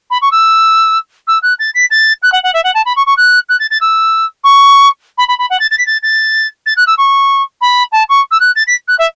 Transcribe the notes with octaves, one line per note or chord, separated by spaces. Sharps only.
B5
C#6
E6
E6
F#6
A6
B6
A6
F#6
F#5
F#5
E5
F#5
A5
B5
C#6
C#6
F#6
F#6
A6
A6
E6
C#6
B5
B5
B5
F#5
A6
A6
B6
A6
A6
A6
F#6
E6
C#6
B5
A5
C#6
E6
F#6
A6
B6
F#6
E5